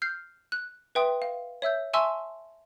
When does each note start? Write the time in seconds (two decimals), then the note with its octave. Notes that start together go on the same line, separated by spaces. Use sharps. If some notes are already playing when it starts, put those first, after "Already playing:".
0.02 F6 G6 C7
0.52 F#6
0.95 B4 E5 G5 C6 D#6
1.22 F5
1.62 C#5 E5 E6 G6
1.94 E5 G#5 A5 C6 C#6 E6